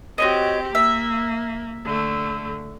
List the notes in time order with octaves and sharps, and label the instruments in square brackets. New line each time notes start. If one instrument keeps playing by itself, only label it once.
[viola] C4 G4 [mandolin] F#4 C#5 D#5
[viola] A#3 [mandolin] E5
[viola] D3 A3